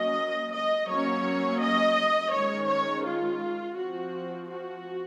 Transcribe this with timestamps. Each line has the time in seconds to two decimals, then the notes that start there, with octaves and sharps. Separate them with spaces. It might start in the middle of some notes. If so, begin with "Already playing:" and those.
Already playing: F#3 A#3 C#4 D#5
0.54 D#5
0.89 F#3 A#3 C#4 C#5
1.61 D#5
2.33 D#3 G#3 C#4 C#5
2.69 C#5
3.05 F4
3.77 F3 C4 F#4
4.49 F#4